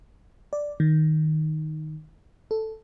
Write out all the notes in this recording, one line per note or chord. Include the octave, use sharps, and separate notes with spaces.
D5
D#3
A4